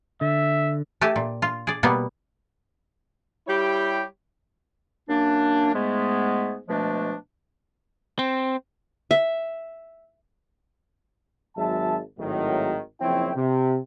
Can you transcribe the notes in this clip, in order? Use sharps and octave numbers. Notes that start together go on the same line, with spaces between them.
D3 E5
A3 G4 G#5 A5
A#2
F4
G#4 D5
B2 G3 A#3 B3
G3 E4 G4 C#5 G5
F#2 A#3 D4
G#2 G#3 A3 B3
B2 F3 G#3 A3 D4
C4
E5
G#1 F#3 G#3 E5 A5
G#1 A2 D#3 F#3
F#1 F3 C4 E4 C#5 G5
C3